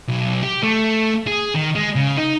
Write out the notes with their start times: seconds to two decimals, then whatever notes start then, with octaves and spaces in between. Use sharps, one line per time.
0.09 B1
0.43 G4
0.63 A3
1.27 G#4
1.55 D#3
1.76 G#3
1.96 C#3
2.18 D#4